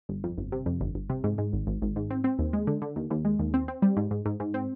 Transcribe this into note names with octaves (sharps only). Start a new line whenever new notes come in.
G1
F2
G1
C3
F2
G1
G1
C3
G#2
G#2
G#1
G#1
G#1
G#2
C4
C4
D#2
G#3
D3
D3
D#2
D#2
G#3
D#2
C4
C4
G3
G#2
G#2
G#2
G#2
C4